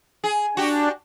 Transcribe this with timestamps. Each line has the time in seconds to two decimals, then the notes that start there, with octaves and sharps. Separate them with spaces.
0.24 G#4
0.57 D4 F#4 G4